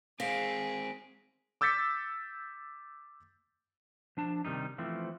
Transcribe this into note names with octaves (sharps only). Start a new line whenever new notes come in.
G#3 C4 G#4 F5 A#6 B6 D7
D6 E6 G6 A6 B6 C#7
F3 D4 A5
C3 D#3 G3 D#4
E3 F3 A3 C4